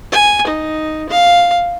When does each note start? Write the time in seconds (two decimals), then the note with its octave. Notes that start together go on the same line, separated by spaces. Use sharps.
0.12 G#5
0.47 D#4
1.09 F5